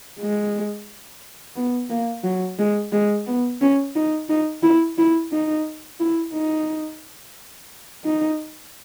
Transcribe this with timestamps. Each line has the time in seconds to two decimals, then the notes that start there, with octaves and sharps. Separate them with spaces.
0.20 G#3
1.56 B3
1.90 A#3
2.24 F#3
2.58 G#3
2.92 G#3
3.26 B3
3.61 C#4
3.95 D#4
4.29 D#4
4.63 E4
4.98 E4
5.32 D#4
6.00 E4
6.33 D#4
8.04 D#4